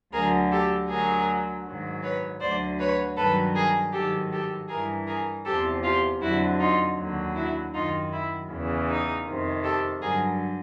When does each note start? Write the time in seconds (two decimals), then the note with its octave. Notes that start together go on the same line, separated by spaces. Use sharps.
0.13 D2 D3 F#3 G#4 A#4
0.51 G4 A4
0.89 D2 D3 F#3 G#4 A#4
1.65 G#2 D#3 F#3
2.03 B4 C#5
2.41 D2 D3 F#3 C5 D5
2.80 B4 C#5
3.17 G2 D#3 F#3 A4 B4
3.55 G#4 A#4
3.93 G#2 D#3 F#3 G4 A4
4.32 G4 A4
4.69 G2 E3 G#4 A#4
5.07 G#4 A#4
5.45 E2 C3 F3 G4 A4
5.84 F4 G4
6.21 F2 D3 F#3 E4 F#4
6.60 D#4 F4
6.98 D#2 D3 F#3
7.36 E4 F#4
7.73 F#2 D#3 F#3 D#4 F4
8.12 E4
8.49 E2 C#3 E3
8.88 D#4
9.26 F2 C3 D#3
9.64 G4 A4
10.01 G2 D3 F#3 G#4 A#4